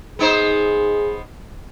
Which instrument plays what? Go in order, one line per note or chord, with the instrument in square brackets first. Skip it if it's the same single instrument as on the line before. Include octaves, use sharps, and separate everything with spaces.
[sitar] B3 D#4 C5 [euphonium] G#4